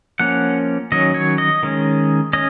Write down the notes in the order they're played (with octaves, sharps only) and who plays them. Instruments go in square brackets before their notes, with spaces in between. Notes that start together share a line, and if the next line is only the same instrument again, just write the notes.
[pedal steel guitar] F3 A#3 C#4 F#5
D#3 F#3 C#4 D#5
C#5
D#5
D#3 G#3 C#4
C#4 D#5